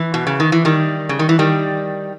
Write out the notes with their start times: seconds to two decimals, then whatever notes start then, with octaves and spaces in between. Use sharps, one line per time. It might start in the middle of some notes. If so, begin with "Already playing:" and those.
Already playing: E3
0.14 B2
0.27 C#3
0.40 D#3
0.52 E3
0.65 D#3 G3
1.09 C#3
1.19 D#3
1.29 E3
1.39 D#3 G3